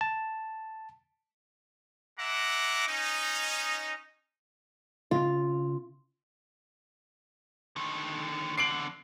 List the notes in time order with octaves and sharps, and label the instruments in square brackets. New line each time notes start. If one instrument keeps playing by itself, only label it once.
[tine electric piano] A5
[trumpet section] G#3 E5 F#5 A#5 D6
C#4 D#4
[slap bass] C#3 C4 [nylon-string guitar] F4
[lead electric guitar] D3 D#3
[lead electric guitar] E2 D3 [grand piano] C7 D7 F#7